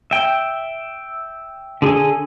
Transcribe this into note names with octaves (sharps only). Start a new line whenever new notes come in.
E5 G5
D3 G#4 A4 G#5